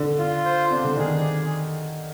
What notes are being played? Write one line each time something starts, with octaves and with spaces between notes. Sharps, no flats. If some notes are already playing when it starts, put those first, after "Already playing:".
Already playing: D3
F4
C5
C3 D4
D3
D#3 G#4